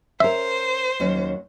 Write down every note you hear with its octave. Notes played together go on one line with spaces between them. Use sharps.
C#4 A#4 C5 E5
D#2 F#3 C#4